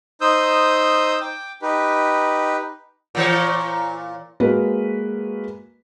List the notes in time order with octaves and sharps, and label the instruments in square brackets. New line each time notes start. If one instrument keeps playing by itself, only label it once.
[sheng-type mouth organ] D#4 C5 D#6 E6 G6
G5 D6
D#4 G4 B4
[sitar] A#2 E3 C#5
[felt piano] G#3 A#3 F#4 A#4 B4